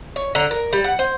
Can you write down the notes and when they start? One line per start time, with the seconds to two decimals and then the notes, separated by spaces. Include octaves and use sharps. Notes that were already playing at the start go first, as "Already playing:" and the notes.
0.16 C#5
0.35 D3 A#5
0.51 A#4
0.73 G3
0.84 F#5
0.99 C5